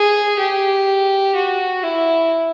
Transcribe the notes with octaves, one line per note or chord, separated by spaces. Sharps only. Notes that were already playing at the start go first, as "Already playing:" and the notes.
Already playing: G#4
G4
F#4
E4